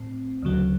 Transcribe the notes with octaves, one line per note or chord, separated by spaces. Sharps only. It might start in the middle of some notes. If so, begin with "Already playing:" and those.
Already playing: A2 C4
D2 C#3 F#3